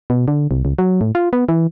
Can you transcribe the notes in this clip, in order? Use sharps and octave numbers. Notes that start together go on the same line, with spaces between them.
B2
D3
C2
C#2
F#3
A2
F4
B3
E3